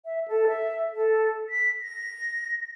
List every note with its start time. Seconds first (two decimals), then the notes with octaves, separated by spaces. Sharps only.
0.05 E5
0.28 A4
0.48 E5
0.93 A4
1.50 B6
1.82 A#6